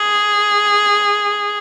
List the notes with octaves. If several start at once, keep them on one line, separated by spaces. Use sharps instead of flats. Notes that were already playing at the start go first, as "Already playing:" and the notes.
Already playing: G#4